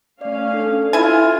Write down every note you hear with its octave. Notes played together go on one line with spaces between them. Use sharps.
A3 C#4 D5 F5
D4 A4
E4 F4 G#5